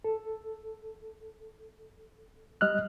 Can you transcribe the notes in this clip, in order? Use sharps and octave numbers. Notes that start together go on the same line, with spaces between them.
A4
G3 D#5 F6 F#6